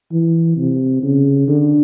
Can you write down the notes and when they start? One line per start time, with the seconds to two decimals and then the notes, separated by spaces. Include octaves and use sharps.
0.12 E3
0.57 C3
1.03 C#3
1.48 D3